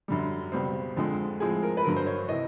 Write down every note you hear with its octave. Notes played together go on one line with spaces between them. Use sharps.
F#2 D3 G3
C#2 B2 G3 C4
F2 D3 F3 G#3 C4
A2 F3 G#3 C4 G#4
A#4
B4
G2 D3 F#3 A#4
C5
C#5
C3 E3 D#5